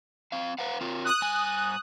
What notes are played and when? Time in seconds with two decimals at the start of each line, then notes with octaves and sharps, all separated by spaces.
0.32 C4 F5
0.59 B4 F5 F#5
0.81 C4 F4 A#4
1.05 D#6 F#6
1.22 G2 G#5